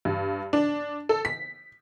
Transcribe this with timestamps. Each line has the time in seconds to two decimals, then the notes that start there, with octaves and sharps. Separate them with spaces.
0.05 G2
0.53 D4
1.09 A4
1.25 B6